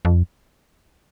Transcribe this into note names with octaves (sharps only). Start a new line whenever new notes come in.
F2